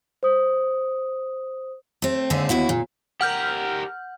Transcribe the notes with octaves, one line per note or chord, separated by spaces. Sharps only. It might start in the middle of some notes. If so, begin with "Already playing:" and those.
C5 D#6
A3 C4
D#2 G#2 D3 A3 C4 G#4
D#2 B2 E4 F#4
A#2
G4 A#4 F#5 F6 G6